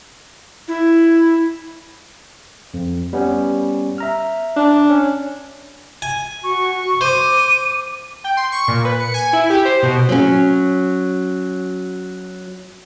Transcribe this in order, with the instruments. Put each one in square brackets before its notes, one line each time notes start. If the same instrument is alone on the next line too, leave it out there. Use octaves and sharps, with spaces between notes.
[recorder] E4
[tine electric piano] F2
G3 B3 C#4
E5 A#5 F6
[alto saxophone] D4
[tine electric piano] C#4
[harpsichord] G#5
[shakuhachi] F#4 [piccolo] C#6
[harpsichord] C5 [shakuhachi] D6 [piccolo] D#7
[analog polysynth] G5
C6
C#6
A#2
B4
C#7
G#5
E4
G4
C5
B2
[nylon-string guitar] F#3 C#4